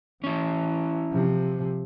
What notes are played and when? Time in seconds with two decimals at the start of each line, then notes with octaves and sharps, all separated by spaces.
0.24 E3 C#4 E4
1.13 C3 F3